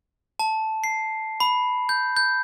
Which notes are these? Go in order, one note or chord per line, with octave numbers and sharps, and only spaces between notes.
A5
C7
B5
G6
G6